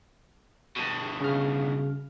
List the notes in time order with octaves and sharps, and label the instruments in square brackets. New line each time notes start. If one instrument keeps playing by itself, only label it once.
[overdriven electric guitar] G2 B2
[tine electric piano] C#3 F6